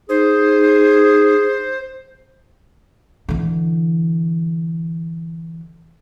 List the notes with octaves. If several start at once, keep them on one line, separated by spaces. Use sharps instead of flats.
D#4 G#4 C5
D3 E3